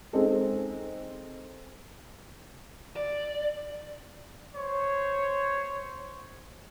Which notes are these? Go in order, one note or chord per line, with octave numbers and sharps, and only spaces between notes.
G#3 C4 D#4 A4
D5
C5 C#5